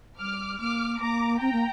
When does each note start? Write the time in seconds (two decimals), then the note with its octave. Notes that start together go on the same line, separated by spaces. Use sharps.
0.19 G3 D6 F6
0.60 A#3 D6 F6
1.00 A#3 A#5 D6
1.41 C4 G5 A#5
1.53 A#3